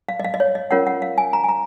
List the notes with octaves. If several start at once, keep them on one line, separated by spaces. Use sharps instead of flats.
F5
D#5
F5
D#5
C#5
D#5
C#4 F4 A#4 C#5 F#5
F#5
F5
G#5
A#5
G#5
A#5